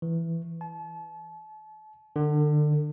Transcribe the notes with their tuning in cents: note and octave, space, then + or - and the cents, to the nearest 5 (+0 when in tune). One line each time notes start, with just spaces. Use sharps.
E3 +10
A5 -35
D3 +30